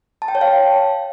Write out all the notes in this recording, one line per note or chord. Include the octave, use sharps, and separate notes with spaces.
A5
G5
C#5
F5